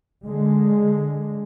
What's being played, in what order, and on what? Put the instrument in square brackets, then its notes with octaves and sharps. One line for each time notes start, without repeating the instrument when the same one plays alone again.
[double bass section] D3 G#3